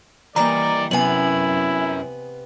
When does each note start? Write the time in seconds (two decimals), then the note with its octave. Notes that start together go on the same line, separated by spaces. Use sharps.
0.36 E3 G3 A#3 D5 D#5 G5 A#5
0.91 F#2 C3 B3 E4 G#5 F#7